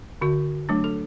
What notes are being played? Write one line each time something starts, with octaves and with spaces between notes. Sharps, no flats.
D3 F#4
F#3 A3 D4
A4